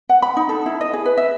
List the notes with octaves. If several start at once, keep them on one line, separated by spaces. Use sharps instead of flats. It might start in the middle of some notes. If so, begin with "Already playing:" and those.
F#5
B5
D#4
A4
E4
D#5
G#4
B4
E5